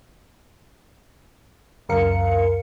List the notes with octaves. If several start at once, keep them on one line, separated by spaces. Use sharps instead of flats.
C#2 F#2 A#4 F5 C#7